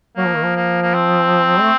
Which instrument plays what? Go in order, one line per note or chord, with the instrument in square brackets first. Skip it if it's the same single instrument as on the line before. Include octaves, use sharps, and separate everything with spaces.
[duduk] F#3 [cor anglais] A#3
[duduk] F3
D#3
F3
[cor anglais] A#3
A#3
C4
[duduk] A3